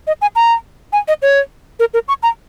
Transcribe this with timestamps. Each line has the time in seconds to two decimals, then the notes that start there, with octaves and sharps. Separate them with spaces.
0.07 D#5
0.22 G#5
0.36 A#5
0.93 G#5
1.08 D#5
1.22 C#5
1.80 A#4
1.94 A#4
2.08 C#6
2.23 A#5